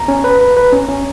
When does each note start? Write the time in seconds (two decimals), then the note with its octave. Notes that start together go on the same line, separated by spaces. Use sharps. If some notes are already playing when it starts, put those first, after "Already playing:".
Already playing: A#5
0.08 C#4
0.24 B4
0.41 B4
0.57 B4
0.72 C#4
0.89 C#4